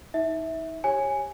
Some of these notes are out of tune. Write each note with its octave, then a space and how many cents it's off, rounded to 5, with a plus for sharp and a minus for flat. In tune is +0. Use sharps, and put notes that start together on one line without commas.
D#4 +30 E5 -15
G4 +5 C#5 -15 G#5 -5